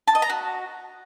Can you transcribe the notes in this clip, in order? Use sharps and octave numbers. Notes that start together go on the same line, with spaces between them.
A5
D#5
A#5
F#4